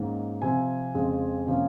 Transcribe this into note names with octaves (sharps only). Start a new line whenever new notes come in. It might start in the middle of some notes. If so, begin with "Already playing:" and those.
Already playing: G#2 D#3 A#3 C#4
C3 F3 C4 G#5
F2 C#3 G#3 C4
C3 F3 A#3 C#4